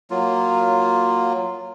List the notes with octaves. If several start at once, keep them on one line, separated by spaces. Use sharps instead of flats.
F#3 A#3 F4